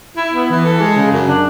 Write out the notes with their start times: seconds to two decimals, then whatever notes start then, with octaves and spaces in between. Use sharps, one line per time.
0.17 E4
0.33 B3
0.49 E3
0.65 A4
0.80 G#3
0.96 C#3
1.12 F#2
1.28 D4